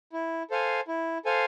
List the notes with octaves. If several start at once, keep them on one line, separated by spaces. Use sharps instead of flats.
E4
A4 C5 F5 G#5
E4
A4 C5 F5 G#5